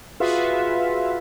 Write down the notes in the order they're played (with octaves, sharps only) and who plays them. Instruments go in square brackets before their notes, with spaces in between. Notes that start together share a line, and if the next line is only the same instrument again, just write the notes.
[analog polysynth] F4 F#4 G#4 B4 E5 F5